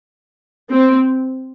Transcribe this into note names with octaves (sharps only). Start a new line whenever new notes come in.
C4